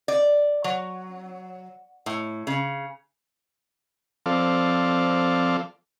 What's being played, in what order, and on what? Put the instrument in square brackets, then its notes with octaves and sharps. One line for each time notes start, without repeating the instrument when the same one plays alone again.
[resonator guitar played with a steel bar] D5
F#3
A2
C#3
[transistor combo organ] F3 C4 A4 D5 F5